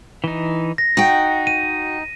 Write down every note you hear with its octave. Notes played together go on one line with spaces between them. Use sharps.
E3 D#4
A#6
D#4 F#4 G5
D#7